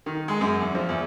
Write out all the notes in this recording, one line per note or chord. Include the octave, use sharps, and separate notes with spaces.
D#3
G#3
F#2
E2
F3
E2